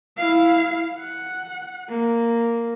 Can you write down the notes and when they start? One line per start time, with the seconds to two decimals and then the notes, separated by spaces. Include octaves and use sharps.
0.17 E4 F5
0.98 F#5
1.89 A#3